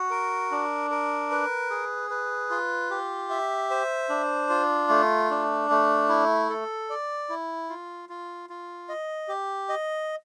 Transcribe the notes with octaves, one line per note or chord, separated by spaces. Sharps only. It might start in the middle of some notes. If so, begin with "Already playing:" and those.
Already playing: F#4
A#4
D4
A#4
B4
G#4
B4
F4
G4
E5
C5
D4
F4
A3
D4
A3
E4
A4
D5
E4
F4
F4
F4
D#5
G4
D#5